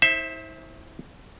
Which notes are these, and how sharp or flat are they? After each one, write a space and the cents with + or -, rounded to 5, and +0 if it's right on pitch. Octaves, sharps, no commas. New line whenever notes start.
E4 -45 C5 +20 E5 +0